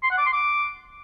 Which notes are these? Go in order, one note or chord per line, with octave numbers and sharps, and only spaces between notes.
C6
F#5
D6
C6
D6